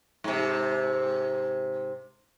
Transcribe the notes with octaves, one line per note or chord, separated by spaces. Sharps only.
G#2 C3